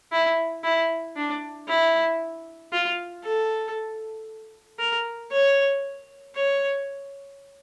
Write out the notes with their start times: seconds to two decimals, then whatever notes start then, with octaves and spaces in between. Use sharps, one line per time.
0.12 E4
0.63 E4
1.16 D4
1.68 E4
2.72 F4
3.24 A4
4.79 A#4
5.32 C#5
6.35 C#5